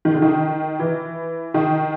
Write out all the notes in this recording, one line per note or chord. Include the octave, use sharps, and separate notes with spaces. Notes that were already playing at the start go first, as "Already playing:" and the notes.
D#3
D3
D#3
E3
D#3